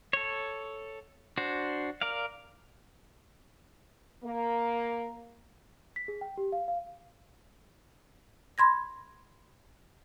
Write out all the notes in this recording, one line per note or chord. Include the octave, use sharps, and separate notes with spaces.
A4 C#5
D4 F#4 C5
A#4 D5 F5
A#3
B6
G#4
G5
G4
F5
F5
B5 C6 G#6 A#6